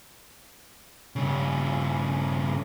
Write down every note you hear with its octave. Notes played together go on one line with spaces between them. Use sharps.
G2 C#3